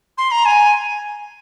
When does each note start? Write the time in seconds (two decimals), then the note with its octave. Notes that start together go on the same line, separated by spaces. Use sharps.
0.18 C6
0.31 A#5
0.45 G#5